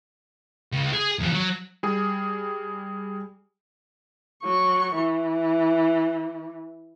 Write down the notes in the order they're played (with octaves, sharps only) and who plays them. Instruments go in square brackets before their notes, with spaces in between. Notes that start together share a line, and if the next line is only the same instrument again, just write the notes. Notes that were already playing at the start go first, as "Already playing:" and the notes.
[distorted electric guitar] C#2
G#4
E2 F3
F#3
[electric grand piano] G3 G#4
[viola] F#3 C#6
E3